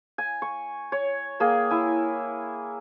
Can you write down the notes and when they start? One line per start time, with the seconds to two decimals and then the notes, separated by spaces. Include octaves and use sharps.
0.18 G#5
0.42 C#6
0.92 C#5
1.40 A#3 G#4 G5
1.71 E4 G#5